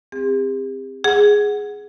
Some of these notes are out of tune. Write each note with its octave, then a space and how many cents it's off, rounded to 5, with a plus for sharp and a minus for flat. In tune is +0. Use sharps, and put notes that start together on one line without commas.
C4 +0 G4 +45
G#4 +0 F#5 +0